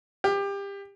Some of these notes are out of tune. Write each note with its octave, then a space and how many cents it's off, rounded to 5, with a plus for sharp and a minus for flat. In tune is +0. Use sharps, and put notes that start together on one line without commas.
G4 +25